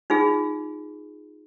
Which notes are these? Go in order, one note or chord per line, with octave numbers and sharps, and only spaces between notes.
D#4 F4 G#4